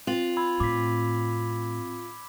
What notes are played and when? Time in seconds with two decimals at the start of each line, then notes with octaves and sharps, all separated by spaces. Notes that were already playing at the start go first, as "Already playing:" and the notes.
0.07 C4 F4 F7 F#7
0.37 B5 E6 G#6
0.60 A2 D6 B6